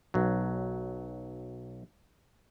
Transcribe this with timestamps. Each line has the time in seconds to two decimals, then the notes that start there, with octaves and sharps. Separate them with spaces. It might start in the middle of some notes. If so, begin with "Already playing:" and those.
0.14 B1 F#3